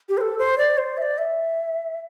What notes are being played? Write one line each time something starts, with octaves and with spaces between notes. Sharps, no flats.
G4
C5
A4
C5
D5
C5
E5
D5
E5